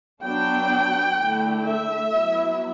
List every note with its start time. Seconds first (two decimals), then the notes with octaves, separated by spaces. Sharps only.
0.23 F#3 B3 D4 G5
1.18 D3 A3 E4
1.65 E5
2.13 F#3 B3 E4